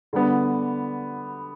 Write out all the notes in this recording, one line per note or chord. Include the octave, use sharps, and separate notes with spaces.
D3 G3 B3